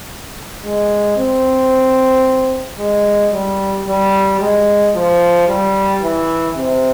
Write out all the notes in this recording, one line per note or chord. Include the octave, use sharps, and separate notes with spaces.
G#3
C4
G#3
G3
G3
G#3
F3
G3
E3
C3